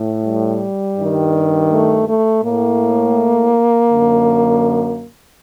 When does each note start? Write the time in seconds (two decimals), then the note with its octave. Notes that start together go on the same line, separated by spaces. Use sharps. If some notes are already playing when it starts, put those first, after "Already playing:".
Already playing: A2
0.23 G3
0.97 G2 D#3
1.70 A3
2.06 A3
2.43 A2 A#3
3.89 F#2 D3